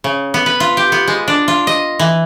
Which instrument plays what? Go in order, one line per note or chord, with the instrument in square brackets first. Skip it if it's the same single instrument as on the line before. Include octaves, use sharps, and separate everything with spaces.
[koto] C#3
B3
B4
F4
G4
B3
G#3
D4
F4
D#5
E3